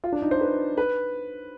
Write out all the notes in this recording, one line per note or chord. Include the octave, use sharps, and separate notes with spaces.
F4
D4
D#4
C5
B4
B4